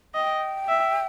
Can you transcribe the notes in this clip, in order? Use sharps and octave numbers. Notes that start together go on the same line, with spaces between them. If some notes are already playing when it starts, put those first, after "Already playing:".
D#5 G5
E5